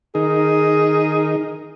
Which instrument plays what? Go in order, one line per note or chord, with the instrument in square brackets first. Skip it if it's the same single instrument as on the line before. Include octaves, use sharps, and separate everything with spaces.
[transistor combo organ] D#3 D#4 A#4 [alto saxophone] G#4